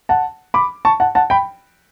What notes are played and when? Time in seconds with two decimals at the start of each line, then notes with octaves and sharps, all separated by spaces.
0.09 F#5 A5
0.54 B5 D6
0.85 A5 C#6
1.00 F#5 A5
1.15 F#5 A5
1.30 G5 B5